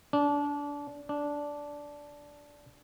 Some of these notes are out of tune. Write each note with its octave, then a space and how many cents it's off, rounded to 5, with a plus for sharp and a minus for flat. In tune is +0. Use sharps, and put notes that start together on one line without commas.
D4 -25
D4 -10